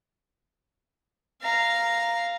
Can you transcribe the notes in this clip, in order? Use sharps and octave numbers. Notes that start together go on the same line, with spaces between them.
F5 A#5